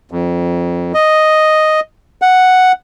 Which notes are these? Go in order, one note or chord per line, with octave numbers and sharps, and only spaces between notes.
F2
D#5
F#5